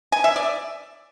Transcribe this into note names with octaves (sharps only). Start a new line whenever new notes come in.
G#5
E5
D5